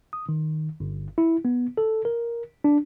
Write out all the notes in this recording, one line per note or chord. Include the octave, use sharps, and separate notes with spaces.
D#6
D#3
G1
E4
B3
A4
A#4
D4